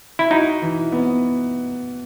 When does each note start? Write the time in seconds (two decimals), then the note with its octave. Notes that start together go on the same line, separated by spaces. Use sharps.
0.19 E4
0.30 D#4 F#4
0.62 E3
0.92 B3